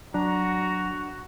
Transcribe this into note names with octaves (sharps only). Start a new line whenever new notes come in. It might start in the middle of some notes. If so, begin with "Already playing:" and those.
F#3 D4 F#4 A#5